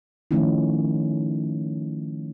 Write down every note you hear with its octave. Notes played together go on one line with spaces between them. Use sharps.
D#3 F3 A3 C#4 D#4 E4